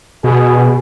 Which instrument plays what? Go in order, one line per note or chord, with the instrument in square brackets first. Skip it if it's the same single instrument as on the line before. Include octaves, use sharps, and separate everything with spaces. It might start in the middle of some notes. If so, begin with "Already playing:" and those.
[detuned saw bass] B2 [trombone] G#4